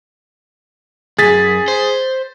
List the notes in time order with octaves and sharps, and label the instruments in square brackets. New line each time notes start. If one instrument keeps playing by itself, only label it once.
[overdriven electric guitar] C#2 F#2 [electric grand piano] G#4 A6 B6
[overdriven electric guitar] C5